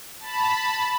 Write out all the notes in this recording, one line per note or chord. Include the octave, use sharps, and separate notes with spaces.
A5 B5